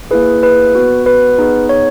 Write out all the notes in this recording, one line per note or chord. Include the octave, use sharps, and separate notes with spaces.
A#3 E4 G#4 B4
B4
B3 F#4
B4
B3 D#4 G#4
C#5